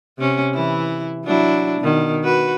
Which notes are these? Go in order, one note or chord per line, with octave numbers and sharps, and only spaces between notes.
C3 C#4
E3 E4
F#3 D4 E4
B2 D#3
F#4 B4